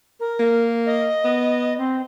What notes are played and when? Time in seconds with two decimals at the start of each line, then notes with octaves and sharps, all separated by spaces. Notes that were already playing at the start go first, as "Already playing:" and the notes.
0.20 A#4
0.40 A#3
0.86 D#5
1.25 B3
1.78 C4